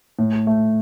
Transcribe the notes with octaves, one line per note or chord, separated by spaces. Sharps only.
A2
A3